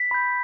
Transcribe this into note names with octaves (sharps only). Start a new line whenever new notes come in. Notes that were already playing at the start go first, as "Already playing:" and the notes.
Already playing: B6
B5 G6